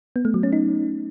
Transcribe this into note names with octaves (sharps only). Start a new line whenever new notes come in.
B3
A3
F#3
C#4
D#4